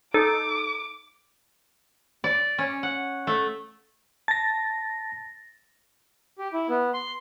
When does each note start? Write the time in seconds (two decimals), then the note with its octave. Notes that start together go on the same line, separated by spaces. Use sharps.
0.14 D#4 A4 D6
2.24 D5
2.58 C#4
2.83 F#5
3.27 A3
4.28 A5 A6 A#6
6.39 G4
6.53 E4
6.69 B3
6.94 C6